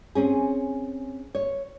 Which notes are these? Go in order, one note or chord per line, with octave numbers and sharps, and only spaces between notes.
C4 C#4 G#4
C#5